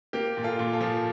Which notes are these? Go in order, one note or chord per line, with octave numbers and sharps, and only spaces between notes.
A#3 G4 A#4
A#2
F4 A4
A#2
F4 A4
F3